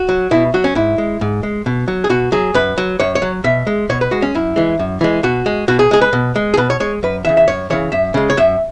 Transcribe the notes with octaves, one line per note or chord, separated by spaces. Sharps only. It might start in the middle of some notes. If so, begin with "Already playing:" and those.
Already playing: F#4
F#3
B2 E4
F#3 F#4
C#4
G#2 E4
G#3
G#2
G#3
B2
F#3
G#4
B2 F#4
F#3 G#4
F#2 B4
F#3
F#2 C#5
C#5
F#3
B2 E5
G#3
B2 C#5
B4
G#3 F#4
C#4
F#2 E4
E3 G#3
F#2
E3 G#3
B2 F#4
G#3
B2 F#4
G#4
G#3 G#4
B4
B2
G#3
G#4
B2 B4
C#5
G#3 C#5
F#2 B4
C#3 E3 E5
E5
F#2 C#5
C#3 E3 C#5
F#2 E5
C#3 G#3
C#5
F#2 E5